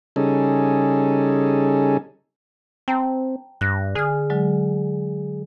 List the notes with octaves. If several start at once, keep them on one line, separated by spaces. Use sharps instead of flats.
C#3 G3 C#4 D#4 G#4 A4
C4 G5 A5 A#5
G2 F#6 A#6
D3 G#4 F6
D3 F#3 G#3